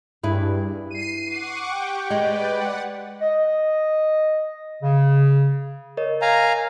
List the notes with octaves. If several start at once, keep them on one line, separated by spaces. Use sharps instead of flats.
G2 E4 G#4 B4
C7 D#7
F#5 C#6 D6
G4 G5
G#3 B4 D5
F#5
D#5
C#3
A#4 C#5 D#5
F5 G#5 A#5